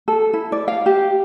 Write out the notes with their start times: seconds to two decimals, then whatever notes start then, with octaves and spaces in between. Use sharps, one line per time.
0.08 A4
0.33 E4
0.52 D5
0.68 F5
0.86 G4